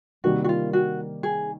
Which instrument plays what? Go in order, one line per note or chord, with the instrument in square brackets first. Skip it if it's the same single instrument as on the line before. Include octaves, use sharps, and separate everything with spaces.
[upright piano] C3 D#3 G3 A#3 [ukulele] F#4
[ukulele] F#4
F4
F#4
G#4